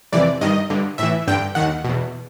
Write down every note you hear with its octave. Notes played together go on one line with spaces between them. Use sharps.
F2 C3 E3 D5
G2 D#3 D#5
G2 D3
A2 E3 E5
G2 D3 G5
D#2 D#3 F#5
E2 B2